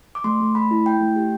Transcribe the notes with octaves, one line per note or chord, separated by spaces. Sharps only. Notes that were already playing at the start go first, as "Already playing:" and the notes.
D6
A3 C6
A3
A3 B5
E4
E4 G5
A3
G4